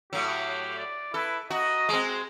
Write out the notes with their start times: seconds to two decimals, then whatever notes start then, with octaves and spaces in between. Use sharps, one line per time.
0.13 A2 F#3 G4
0.78 D5
1.14 E4 A4 B4
1.50 F#4 D#5 A#5
1.89 G#3 C4